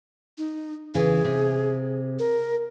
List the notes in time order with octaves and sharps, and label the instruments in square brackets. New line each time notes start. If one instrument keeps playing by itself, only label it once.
[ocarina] D#4
[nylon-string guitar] E2 C#3 E3 [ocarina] G#4
[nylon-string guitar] C3
[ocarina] A#4